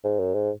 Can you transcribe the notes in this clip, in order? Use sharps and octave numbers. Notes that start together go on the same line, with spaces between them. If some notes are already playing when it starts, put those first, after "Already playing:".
G#2
F#2
G#2